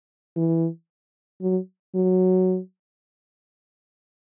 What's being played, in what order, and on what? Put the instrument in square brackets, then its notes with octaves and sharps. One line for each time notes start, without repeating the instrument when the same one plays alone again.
[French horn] E3
F#3
F#3